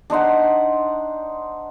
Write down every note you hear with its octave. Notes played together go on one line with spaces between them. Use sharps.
D4 D#4 C5 F#5